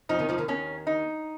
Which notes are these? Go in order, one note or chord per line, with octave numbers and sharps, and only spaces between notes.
F2 F3 D#4
D#2 D#3
F2 F3
D#2 D#3
D#2 D#3 C#4
D#4